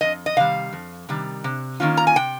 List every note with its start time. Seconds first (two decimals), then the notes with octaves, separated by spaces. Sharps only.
0.01 F2 D#5
0.26 D#5
0.36 C3 D#3 G3 F5
0.73 F2
1.09 C3 D#3 G3
1.44 C3
1.80 D#3 A#3 C#4 F4
1.97 A#5
2.07 G#5
2.16 C3 G5